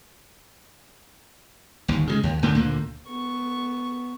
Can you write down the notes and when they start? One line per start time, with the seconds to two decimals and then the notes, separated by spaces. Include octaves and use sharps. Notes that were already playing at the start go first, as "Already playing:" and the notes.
1.88 G1 D#2
2.07 C#3 F3 G#3
2.23 D#2
2.42 C#2 D3 A3 A#3
2.55 D2 A#2 D3 A#3
3.09 B3 C#6